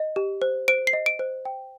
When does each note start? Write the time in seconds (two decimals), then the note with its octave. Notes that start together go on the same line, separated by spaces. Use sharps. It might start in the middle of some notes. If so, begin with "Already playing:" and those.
Already playing: D#5
0.16 G4
0.42 C5
0.68 C5 D7
0.87 C7
0.93 D#5
1.06 D7
1.19 C5
1.45 G5